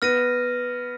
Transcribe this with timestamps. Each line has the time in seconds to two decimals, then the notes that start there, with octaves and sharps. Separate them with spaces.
0.02 B3 F6 A#6 D#7